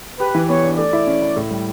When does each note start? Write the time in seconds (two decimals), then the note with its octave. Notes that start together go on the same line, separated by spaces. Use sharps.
0.19 G4 B4
0.35 E3
0.49 B3 C#5
0.63 D4
0.78 A3 D5
0.93 E4
1.07 C#4
1.22 E4
1.36 A2
1.51 G3